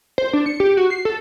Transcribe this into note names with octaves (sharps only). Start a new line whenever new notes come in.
C5
D4
C#7
G4
F#4
C7
A4